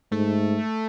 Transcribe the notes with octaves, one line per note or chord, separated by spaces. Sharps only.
G#2 A3